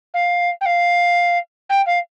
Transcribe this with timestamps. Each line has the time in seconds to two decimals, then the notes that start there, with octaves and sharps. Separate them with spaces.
0.14 F5
0.61 G5
0.65 F5
1.69 G5
1.86 F5